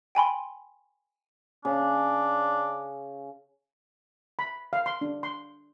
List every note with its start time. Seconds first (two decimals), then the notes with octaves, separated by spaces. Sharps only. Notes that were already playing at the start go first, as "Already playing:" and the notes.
0.15 G5 G#5 B5 C6
1.65 C#3 D4
4.39 B5
4.73 F5
4.86 C6
5.01 D4
5.23 C6